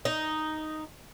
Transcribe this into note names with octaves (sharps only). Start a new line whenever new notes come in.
D#4